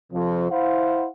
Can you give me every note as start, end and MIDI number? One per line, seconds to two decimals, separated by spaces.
0.12 0.50 41
0.12 0.50 48
0.12 0.50 53
0.51 1.08 64
0.51 1.08 72
0.51 1.08 77
0.51 1.08 78